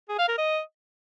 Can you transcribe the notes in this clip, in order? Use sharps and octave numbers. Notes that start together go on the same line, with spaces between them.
G#4
F5
A#4
D#5